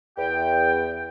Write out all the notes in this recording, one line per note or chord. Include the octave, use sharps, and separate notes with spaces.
E2 G5